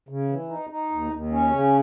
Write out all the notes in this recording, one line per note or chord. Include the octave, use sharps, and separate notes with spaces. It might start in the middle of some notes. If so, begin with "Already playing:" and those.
C#3
E3
D#4
D#4
D#2
D#2
C#4
C#3